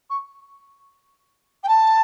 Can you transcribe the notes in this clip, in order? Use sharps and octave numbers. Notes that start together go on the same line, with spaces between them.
C#6
G5
A5